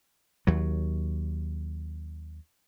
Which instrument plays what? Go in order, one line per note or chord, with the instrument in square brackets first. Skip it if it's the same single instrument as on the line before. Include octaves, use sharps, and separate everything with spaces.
[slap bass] D#2 F#3